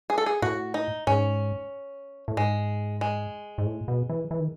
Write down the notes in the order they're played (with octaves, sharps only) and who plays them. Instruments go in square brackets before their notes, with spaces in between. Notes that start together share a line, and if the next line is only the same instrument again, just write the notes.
[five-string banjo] G#4
A4
G#4
[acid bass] A2 [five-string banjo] F#4
[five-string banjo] D#4
[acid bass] G#2 [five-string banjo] C#4
[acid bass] A2
[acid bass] G#2 [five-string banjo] G#3
[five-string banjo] G#3
[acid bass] G#2
A2
B2
E3
E3
D#3